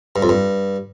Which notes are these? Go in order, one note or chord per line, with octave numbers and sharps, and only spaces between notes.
G2
F2
G2